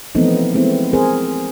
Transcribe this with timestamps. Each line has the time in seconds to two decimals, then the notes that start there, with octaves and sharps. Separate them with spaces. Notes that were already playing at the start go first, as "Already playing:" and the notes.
0.15 E3 F3 A3 B3 C4 D#4
0.54 G#3 A3 B3 C4 E4
0.93 C4 G#4 A#4 C5